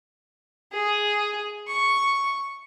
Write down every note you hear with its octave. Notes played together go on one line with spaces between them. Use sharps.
G#4
C#6